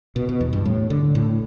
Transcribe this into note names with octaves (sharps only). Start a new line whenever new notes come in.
B2
B2
E2
G2
A2
D3
A2